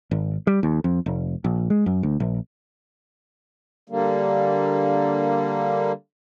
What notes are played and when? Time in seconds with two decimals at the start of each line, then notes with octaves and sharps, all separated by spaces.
0.11 G#1
0.47 G3
0.63 D#2
0.84 F2
1.06 F1
1.44 A#1
1.70 G#3
1.86 F#2
2.03 D2
2.20 A#1
3.90 D3 G3 A#3